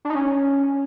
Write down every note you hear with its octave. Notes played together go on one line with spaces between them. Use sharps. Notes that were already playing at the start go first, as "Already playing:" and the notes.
D4
D#4
C#4